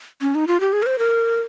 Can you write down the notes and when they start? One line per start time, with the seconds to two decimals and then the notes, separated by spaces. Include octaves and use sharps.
0.22 C#4
0.35 D#4
0.47 F4
0.60 G4
0.73 G#4
0.82 A#4
0.86 C5
0.99 A#4